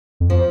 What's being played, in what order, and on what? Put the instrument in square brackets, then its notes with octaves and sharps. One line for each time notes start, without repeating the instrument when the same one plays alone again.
[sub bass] F2
[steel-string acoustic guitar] F3